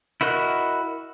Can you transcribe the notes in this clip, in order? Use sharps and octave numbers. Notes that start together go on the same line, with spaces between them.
E4 F#4 A#4 D#5 F#6